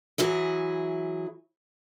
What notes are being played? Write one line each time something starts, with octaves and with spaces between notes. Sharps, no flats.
E3 F#3 E4 G#4